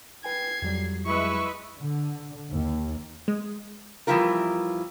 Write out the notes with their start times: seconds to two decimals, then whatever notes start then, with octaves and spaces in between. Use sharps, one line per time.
0.24 B4 G5 G#5 G#6 C7
0.62 F2 F#3 G3
1.05 G#3 E4 B4 E5 C#6
1.78 D3
2.51 D#2
3.28 G#3
4.07 E2 E3 F3 G3 F4 A#4